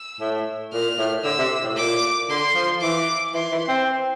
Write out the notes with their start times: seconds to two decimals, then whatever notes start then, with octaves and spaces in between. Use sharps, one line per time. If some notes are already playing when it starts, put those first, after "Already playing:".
Already playing: E6
0.20 A2
0.73 A#2 F6
0.98 A2
1.24 D3 E6
1.38 C3
1.64 A2
1.77 A#2 D6
2.29 D3 C6
2.55 F3
2.81 E3 D6
3.34 E3 C6
3.52 E3
3.68 C4